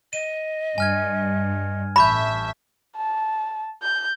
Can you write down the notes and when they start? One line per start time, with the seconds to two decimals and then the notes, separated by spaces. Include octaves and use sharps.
0.13 D#5 D#7
0.78 G2 G#5 F6 G#6
1.96 A1 E5 A5 B5 C#6 G6
2.96 A5
3.83 G6